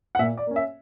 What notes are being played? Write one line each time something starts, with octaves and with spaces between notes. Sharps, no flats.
F#5
A#2 E5
D5
A#3 C#4
E5